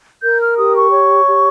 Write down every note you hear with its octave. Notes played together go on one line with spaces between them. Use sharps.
A#4 G6
F6
G4 D#6
C#6
C#5
G4